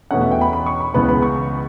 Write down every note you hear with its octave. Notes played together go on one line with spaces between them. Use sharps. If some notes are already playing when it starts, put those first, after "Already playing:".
E2 B2 A3 C#4 F#5
E5
G5
B5
B5
C#6
B5
C#2 C#3 E3 B3 B5
B5
C#6